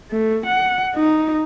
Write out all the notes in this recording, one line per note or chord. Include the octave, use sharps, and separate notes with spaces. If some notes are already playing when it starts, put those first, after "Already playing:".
A3
F#5
D#4